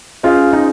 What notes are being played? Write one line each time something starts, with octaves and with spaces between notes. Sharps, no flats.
C#4 F4 G#4 C5 D#5
D#4